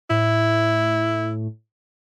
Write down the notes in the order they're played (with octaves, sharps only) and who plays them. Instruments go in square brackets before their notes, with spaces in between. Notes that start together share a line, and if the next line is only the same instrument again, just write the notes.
[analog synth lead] A2 [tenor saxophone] E4